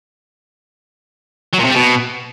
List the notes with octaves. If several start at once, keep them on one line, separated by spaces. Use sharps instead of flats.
F#3
A#2
C3
G3
B2